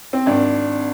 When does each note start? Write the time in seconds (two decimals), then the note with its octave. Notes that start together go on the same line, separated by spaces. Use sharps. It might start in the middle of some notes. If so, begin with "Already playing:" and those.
0.13 C4
0.26 G#1 D4